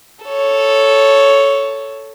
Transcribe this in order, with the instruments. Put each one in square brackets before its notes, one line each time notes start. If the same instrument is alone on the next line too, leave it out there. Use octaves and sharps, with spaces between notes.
[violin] A4 C#5